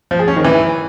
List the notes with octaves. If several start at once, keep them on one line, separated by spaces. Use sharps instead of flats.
F3
G#4
C#4
D#3
E3